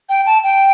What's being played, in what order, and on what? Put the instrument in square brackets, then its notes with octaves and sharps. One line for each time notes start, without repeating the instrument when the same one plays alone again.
[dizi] G5
A5
G5